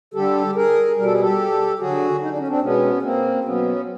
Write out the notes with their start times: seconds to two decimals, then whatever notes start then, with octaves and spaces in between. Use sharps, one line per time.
0.14 D3 G3 G4 A4
0.55 G#4 A#4
0.96 B2 G3 A#4
1.05 A4
1.13 G#4
1.20 G4 A4
1.79 D3 F#3 F#4 G#4
2.20 D#4
2.29 D4
2.39 C#4
2.48 C4 D4
2.61 B2 G#3 B3 C#4
3.02 A#3 C4
3.44 B2 F#3 B3 C#4